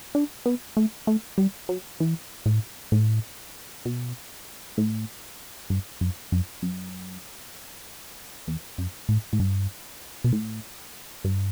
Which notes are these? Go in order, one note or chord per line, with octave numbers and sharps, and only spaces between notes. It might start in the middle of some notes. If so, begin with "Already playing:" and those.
D4
B3
A3
A3
G3
F#3
E3
A2
A2
B2
A2
G2
F#2
F#2
F#2
E2
F#2
A2
A2
G2
B2
A2
G2